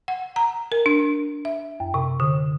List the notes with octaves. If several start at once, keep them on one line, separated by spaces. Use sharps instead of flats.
F#5
A#5
A#4
D4
E5
F#2
C3
D3